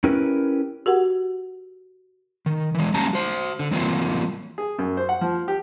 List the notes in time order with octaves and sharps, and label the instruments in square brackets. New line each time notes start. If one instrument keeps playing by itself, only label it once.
[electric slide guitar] C#4 E4 G4 A#4 B4
[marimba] F#4 G4 A#4 F#5
[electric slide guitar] D#3
E3 G#3
F#3 G3 A#3 C#4 A5 A#5
F#4 C5
D3
E3 F#3 G3 A#3 C4 F4
[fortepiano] G#4
F#2
C5
F#5
F3
G4